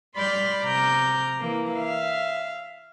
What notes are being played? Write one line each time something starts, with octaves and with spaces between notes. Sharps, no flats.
G3 D5 B5 C6 F6 G6
C3 A#5 D6 F6 G6
E3 A#3
E5 F5